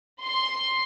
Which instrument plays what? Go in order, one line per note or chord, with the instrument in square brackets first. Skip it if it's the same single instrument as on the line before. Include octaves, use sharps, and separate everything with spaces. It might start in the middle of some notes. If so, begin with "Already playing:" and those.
[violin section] C6